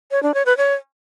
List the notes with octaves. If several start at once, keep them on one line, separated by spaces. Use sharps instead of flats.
C#5
D4
C#5
B4
C#5